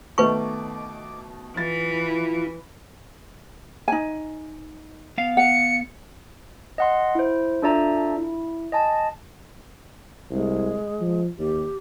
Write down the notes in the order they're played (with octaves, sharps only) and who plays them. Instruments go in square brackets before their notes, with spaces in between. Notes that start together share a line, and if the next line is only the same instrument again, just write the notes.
[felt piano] B2 D#3 A3 [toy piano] B4 C#6 [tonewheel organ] D6
[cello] E3 [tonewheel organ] E4 F4 [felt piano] A6
[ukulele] D#4 G#5
[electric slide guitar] B3 F5
[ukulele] F#5 [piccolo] C#7
[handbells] D#5 F#5 C6
E4 C5
D4 F4 A4 D5 E5 A#5
E4
D#5 G#5 A5
[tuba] C2 [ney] G#3
[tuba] F3
[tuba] D#2 [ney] G4